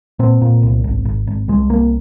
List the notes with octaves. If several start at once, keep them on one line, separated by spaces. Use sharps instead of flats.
A#2 C4
A#2
C2
G#1
G#1
G#1
C2 G#3
C2 A#3